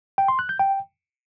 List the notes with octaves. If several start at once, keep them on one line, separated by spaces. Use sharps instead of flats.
G5
C6
F#6
G6
G5